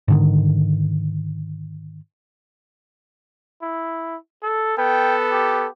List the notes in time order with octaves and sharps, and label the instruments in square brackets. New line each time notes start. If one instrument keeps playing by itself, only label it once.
[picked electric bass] G#2 D3 D#3
[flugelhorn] E4
A4
[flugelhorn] B3 [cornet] A4 [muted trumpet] G5
[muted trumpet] G4